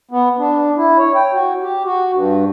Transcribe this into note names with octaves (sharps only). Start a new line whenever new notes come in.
B3
D4
E4
C#5
G5
F#4
G4
F#4
G2